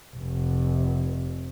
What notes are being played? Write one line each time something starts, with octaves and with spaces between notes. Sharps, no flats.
F1